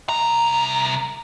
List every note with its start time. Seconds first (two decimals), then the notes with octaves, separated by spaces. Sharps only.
0.09 C2 A#5